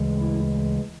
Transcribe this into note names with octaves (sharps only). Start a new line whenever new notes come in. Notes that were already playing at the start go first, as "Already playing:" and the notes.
Already playing: D2 C#3 E3 G#3
E4